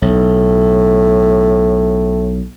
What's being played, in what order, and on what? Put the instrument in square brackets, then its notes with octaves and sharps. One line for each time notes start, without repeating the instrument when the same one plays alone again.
[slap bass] B1 [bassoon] A2